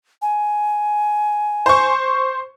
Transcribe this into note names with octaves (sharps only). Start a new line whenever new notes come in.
G#5
C5 C#6